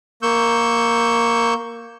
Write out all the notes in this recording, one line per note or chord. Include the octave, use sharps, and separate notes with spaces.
A#3 C#6 E6 G6